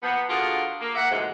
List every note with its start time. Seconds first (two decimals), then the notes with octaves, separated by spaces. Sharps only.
0.03 F3 A#3 B3
0.30 D3 F4 F#4 G#4 A#4
0.80 A#3
0.95 A#3 E5 F#5
1.11 D2 G#2 E3 F3 G#3